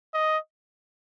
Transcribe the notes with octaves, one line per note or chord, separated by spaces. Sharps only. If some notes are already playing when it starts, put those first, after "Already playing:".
D#5